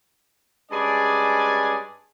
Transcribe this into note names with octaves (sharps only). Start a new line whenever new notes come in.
G2 G#3 C#4 G#4 D5 G#5